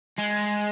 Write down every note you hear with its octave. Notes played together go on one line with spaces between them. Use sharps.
G#3